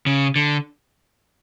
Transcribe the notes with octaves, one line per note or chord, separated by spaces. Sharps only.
C#3
D3